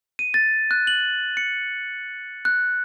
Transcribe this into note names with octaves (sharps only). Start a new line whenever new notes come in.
D#7
A6
F#6
F#7
C#7
F#6